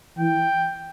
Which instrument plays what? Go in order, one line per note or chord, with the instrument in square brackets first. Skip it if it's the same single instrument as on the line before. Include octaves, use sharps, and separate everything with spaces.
[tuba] E3 [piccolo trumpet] G5